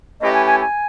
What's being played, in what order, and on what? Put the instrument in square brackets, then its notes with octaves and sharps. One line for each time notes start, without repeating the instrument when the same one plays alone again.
[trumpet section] A3 C#4 E4 G4 B4 [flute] D#5
[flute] G#5
G#5
G#5